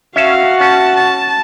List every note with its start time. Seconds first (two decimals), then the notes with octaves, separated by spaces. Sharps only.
0.16 C#4 F#4 E5 F5 A5
0.60 C#4 A5
0.97 A5